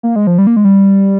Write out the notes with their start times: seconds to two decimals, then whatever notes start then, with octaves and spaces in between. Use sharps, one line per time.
0.03 A#3
0.16 G#3
0.27 F3
0.38 G3
0.47 A#3
0.57 G#3
0.65 G3